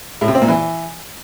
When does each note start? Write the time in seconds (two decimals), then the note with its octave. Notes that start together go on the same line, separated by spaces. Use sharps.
0.21 A2
0.28 C3
0.35 C4
0.42 A#2
0.48 E3